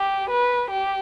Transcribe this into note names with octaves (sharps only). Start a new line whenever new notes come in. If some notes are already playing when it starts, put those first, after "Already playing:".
Already playing: G4
B4
G4